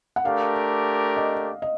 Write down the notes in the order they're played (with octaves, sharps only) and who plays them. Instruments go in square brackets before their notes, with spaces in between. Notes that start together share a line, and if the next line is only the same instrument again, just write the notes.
[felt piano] F#5
[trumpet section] A3 D4 G4 A#4 [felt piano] F5
[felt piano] D#5
D#5